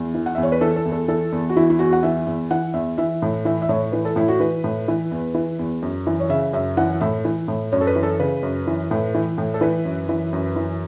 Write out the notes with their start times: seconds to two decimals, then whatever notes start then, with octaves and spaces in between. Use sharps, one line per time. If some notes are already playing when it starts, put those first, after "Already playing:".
Already playing: E2
0.14 E3
0.26 F#5
0.35 E2 E5
0.43 C#5
0.52 B4
0.61 E3 A4
0.76 A4
0.85 E2
0.92 A4
1.08 E3 A4
1.32 E2
1.49 F#4
1.56 E3 E4
1.70 E4
1.79 E2 F#4
1.93 F#5
2.03 E3 E5
2.27 E2
2.51 E3 F#5
2.74 E2 E5
2.98 E3 E5
3.22 A2
3.45 E3 E5
3.62 E5
3.69 A2 C#5
3.92 E3 B4
4.05 A4
4.16 A2 E4
4.28 F#4
4.40 E3 B4
4.64 A2
4.88 E3
5.11 E2
5.34 E3
5.59 E2
5.82 F#2
6.07 E3
6.20 C#5
6.29 C#3 E5
6.53 F#2 E5
6.77 E3 F#5
7.01 A2 E5
7.25 E3
7.48 A2
7.72 F#2 C#5
7.81 A4
7.87 B4
7.96 E3
8.03 A4
8.19 C#3 B4
8.43 F#2
8.67 E3
8.91 A2
9.14 E3
9.38 A2
9.54 A4
9.61 E3 B4
9.85 F#2
10.09 E3
10.33 F#2
10.56 E3